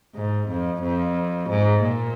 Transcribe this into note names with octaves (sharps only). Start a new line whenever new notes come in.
G#2
F2
F2
G#2
A#2